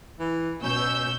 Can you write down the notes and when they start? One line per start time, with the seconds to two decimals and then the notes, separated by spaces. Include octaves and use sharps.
0.20 E3
0.63 B2 C#4 E6 G6